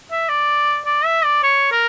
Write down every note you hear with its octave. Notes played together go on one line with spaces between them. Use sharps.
E5
D5
D5
E5
D5
C#5
A#4